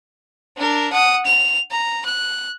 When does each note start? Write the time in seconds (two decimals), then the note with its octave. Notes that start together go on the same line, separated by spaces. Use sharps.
0.57 D4 A#4
0.93 F#5 D#6
1.26 F7
1.71 A#5
2.06 F#6